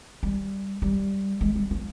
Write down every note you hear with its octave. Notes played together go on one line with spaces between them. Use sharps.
G3
G3
G#3
G3
F3